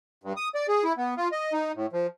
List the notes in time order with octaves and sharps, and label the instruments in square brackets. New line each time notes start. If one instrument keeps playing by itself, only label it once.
[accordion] G2
D#6
D5
G#4
E4
B3
F4
D#5
D#4
A2
F3